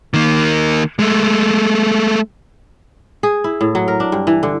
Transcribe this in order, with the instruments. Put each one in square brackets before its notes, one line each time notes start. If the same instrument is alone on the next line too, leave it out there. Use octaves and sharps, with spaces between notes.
[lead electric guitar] D#3 A#3
G#3 A3
[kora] G#4
E4
A2
F#3
A#4
D4
G2
E3
D3